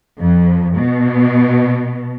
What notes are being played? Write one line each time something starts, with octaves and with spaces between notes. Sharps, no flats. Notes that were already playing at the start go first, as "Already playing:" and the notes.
F2
B2